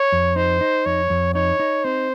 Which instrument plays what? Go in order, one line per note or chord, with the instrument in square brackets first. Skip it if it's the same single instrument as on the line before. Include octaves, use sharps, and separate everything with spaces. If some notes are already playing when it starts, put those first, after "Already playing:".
Already playing: [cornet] C#5
[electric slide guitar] F2
[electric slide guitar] D#4 [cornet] C5
[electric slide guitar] D#4
[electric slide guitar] F2 [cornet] C#5
[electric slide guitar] F2
[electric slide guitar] D#4 [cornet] C#5
[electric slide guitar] D#4
[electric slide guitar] C4 [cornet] C5